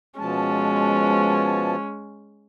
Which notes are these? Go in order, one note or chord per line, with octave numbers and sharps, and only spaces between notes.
B2 F3 G#3 C#4 A5